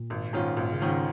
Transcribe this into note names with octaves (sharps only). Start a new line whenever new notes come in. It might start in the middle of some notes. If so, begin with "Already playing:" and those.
Already playing: A#2
G#1
G#2 D#3 C#4 F4
G#1 A#2
C#3
G#2 D#3 C#4 F4
C#3